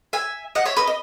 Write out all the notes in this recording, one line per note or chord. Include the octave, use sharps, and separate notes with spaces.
E5 G#5
D#5 F#5
C#5 E5
B4 D#5
D#5